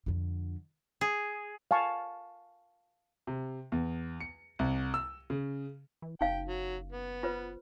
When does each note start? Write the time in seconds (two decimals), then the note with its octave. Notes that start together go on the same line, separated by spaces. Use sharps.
0.06 F2 D3
1.01 G#4
1.71 F5 G#5 A5 C#6
3.27 C3
3.72 E2
4.20 C#7
4.59 C2
4.94 E6
5.30 C#3
6.02 E3
6.21 F#1 D#4 F5 G5
6.48 F#3
6.92 B3
7.23 F4 B4 C5